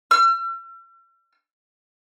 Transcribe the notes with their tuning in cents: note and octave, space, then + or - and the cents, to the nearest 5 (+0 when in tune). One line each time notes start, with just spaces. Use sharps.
E6 +45